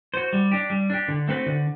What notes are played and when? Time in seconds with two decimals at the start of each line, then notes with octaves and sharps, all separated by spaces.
0.14 F#4 C5
0.33 G3
0.52 D4 G4
0.70 G3
0.90 D4 G4
1.08 D3
1.28 A3 C4 F#4 B4
1.46 D3